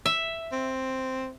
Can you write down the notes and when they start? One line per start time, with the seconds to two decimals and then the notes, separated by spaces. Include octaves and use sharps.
0.06 E5
0.52 C4